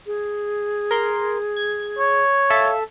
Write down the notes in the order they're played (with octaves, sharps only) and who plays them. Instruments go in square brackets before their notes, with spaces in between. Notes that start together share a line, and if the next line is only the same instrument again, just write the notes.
[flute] G#4
[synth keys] A#4 C6
G#6
[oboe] C#5
[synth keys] A4 E5 A5 [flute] F5